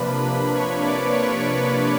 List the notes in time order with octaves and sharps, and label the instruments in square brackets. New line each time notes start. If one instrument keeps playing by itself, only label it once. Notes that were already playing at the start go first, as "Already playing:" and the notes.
Already playing: [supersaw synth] C3 F3 A#3 D4 B4 B5
C#5 C#6
D5 D6
C#5 C#6